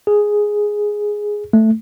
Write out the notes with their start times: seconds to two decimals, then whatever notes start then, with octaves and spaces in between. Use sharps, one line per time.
0.07 G#4
1.53 A3